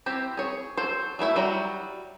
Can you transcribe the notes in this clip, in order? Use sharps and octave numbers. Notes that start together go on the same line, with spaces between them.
C4 E4 G4
G#4 C#5
F#3 A4 C5
F#3 A3 E4 E5
F#3 G3 F#5 A#5